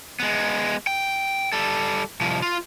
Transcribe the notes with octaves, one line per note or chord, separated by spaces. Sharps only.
G#3 B3
G5
G3 A4
C2 F3
F4